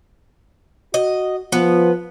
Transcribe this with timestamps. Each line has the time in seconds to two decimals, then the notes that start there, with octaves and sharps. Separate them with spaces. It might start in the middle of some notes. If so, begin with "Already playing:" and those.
0.94 F#4 D#5
1.52 F3 B3